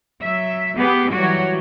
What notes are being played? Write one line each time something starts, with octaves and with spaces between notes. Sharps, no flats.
F#3 E5
B3 G4 G#4
E3 F#3 G3 F#4 C#5